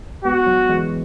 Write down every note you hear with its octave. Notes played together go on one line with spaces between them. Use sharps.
G#3 B3 F#4
F#3
E3 G#3